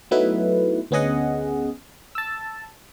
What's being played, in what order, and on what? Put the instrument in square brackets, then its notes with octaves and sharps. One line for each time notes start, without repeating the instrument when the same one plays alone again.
[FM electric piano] F#3 A3 B3 D#4 E4 B4
D2 B3 C#4 G#4 D#5 F#5
A5 E6